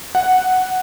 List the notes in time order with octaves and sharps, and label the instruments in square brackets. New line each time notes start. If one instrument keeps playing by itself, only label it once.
[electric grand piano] F#5